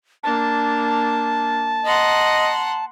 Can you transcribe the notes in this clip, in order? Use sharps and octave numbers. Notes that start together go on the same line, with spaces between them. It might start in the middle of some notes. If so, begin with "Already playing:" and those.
A#3 D4 A5
D#5 F#5 A#5 C6